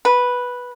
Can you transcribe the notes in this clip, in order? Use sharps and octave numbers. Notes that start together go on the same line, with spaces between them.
B4